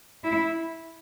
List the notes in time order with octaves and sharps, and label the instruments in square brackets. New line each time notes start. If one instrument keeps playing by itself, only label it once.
[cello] E4